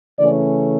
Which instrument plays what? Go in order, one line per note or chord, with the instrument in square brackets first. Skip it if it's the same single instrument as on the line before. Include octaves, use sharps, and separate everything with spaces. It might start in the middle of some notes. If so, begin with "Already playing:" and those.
[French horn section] C#3 E3 A3 C#4 D5